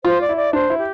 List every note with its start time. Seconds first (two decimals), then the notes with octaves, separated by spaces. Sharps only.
0.04 F4 C5
0.21 D5
0.29 E4
0.37 D5
0.53 D4 C5
0.70 E4
0.78 G4